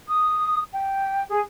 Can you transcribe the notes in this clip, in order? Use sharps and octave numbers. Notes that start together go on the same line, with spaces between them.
D#6
G5
G#4